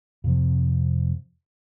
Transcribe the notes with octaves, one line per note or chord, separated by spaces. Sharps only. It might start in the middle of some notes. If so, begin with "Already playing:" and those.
F2 C3 F3